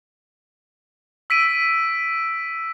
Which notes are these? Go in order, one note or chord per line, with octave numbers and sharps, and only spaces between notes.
E6 B6 D7 D#7